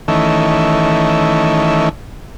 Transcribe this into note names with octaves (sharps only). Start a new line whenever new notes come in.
D#3 E3 A3 C#4